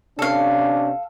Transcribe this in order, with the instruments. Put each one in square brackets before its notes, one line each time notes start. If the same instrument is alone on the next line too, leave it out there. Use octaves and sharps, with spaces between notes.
[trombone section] C3 C#4 D4 [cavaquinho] A4 F5